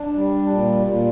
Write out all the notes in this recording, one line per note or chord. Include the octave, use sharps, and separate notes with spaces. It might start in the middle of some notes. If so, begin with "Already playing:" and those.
Already playing: D4
G3
A#2
A#2